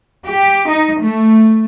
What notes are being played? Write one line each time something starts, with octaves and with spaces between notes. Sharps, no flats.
G4
D#4
A3